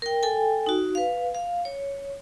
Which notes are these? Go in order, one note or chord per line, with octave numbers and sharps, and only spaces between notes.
A#4 G5
A4 G5 G#5
D#4 F#4
B4 F5
F5
C#5